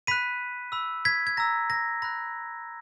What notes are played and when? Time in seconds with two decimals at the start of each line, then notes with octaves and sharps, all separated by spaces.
0.07 B5 F#6 B6 D#7
0.72 B5 E6
1.05 G#6 B6
1.27 G#6
1.37 A#5 E6 A#6
1.70 A#6
2.02 B5 F#6 A#6